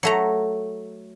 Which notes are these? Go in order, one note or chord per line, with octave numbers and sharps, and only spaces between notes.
F#3 A3 A#5